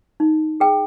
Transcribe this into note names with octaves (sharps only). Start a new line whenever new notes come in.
D#4
G#4 G5